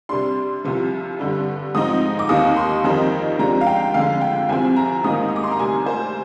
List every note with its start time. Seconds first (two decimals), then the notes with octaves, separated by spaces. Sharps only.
0.09 C3 G3 D4 C6
0.64 C2 C3 F3
1.19 G2 D3 G3
1.75 G#2 F3 C4 D#4 D#6
2.19 D6
2.29 D#2 D#3 A#3 D#4 D#6
2.57 C6
2.84 F2 D#3 G3 C4 D#4
3.39 C3 F3 G#3 D4 A#5
3.61 F5
3.67 G5
3.94 F2 D3 G#3 F5
4.21 G5
4.49 C2 C3 F3 C4 G#5
4.76 A#5
5.04 G#2 D#3 A#3 D#4 D#6
5.29 D#6
5.36 D6
5.43 C6
5.51 A#5
5.59 D2 C3 G3 G#5
5.86 C5